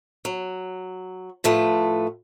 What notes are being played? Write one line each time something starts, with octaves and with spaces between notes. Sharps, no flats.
F#3
A2 F3 A3 B4